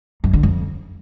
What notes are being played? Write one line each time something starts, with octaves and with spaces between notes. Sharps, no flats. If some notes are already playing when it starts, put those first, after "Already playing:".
F#2
D3
F2